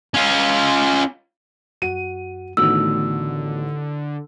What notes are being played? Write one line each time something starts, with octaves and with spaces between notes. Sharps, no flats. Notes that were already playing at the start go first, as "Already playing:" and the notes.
C#4 F4
F#2 F#4 F#5 D#7
A1 D3 D#3 A3 B3 F#4 E6